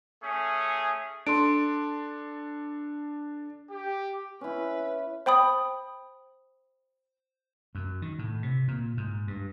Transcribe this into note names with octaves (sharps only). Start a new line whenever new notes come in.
A3 C#4 G#4
D4 A4 C6 D7
G4
C#4 E4 B4
C5 G5 B5 D#6
F#2
D#3
A2
C3
A#2
G#2
G2